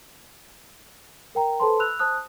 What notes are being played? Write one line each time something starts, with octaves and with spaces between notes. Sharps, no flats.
A#4 G5 A#5
A4 B4 C5 A5 B5 C6
B5 E6 F#6 F7
C5 A5 D#6 F#6